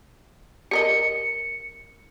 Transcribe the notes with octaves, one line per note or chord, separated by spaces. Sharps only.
G4 A#4 D#5 C#7